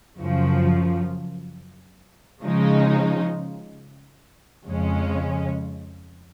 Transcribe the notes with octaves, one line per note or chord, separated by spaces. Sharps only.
F#2 C#3 F3
C#3 F3 G#3 D#4
F2 C#3 G#3 C#4